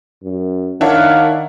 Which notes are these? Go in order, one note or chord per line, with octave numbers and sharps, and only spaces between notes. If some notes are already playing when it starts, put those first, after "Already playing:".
F#2
D#3 D4 E4 A#4 C#5 F5 F#5